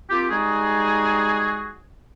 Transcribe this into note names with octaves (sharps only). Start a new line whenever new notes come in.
A#3 C4 F4 G4
G3 G#3 D#4 F#4 G#4